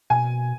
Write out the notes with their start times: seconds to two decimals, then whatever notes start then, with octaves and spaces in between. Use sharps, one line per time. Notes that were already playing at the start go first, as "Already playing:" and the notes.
0.10 B2 G#5